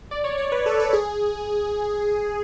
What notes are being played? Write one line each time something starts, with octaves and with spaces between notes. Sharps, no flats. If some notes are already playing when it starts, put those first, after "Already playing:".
D5
C#5
C#5
B4
A4
A4
G#4